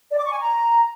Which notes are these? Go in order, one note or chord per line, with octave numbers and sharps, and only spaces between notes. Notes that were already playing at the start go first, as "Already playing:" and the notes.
D5
D6
C#6
G#5
A#5